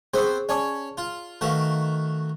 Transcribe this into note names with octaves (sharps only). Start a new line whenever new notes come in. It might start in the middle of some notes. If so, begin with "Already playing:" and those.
B3 C4 G#4 C5 C#6
C#4 C#5 D5 A5 D6
F4
D#3 A3 D#4 F#4 B4 F5